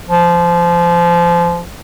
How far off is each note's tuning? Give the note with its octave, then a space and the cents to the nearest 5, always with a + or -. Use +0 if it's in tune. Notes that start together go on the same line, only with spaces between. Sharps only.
F3 -20